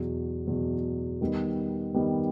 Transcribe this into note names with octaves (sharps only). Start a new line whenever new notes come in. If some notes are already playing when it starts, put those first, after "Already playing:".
Already playing: E2 B2 F#3
E2 B2 F#3
D#3 G3 B3
D#3 G3 B3